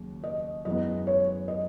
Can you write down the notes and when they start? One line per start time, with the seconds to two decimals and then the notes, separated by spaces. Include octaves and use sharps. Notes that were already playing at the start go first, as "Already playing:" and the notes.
Already playing: D#2 C#3 F#3
0.24 D#5
0.65 F#2 E3 G#3 B3 D#5
1.07 C#5
1.48 D#5